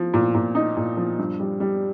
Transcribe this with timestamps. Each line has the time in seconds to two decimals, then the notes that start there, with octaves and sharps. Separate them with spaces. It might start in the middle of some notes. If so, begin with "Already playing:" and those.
Already playing: F3
0.14 A#2
0.35 A#2
0.55 D#4
0.77 A#2
0.97 F3
1.18 G2
1.40 G3
1.60 G3